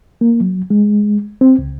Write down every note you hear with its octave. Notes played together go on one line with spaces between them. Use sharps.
A#3
F#3
G#3
C4
C#2